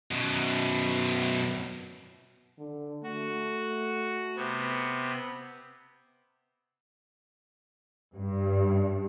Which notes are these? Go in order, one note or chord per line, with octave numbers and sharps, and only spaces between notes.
F#2 B2
D3
A3 F#4
C3 B3
G2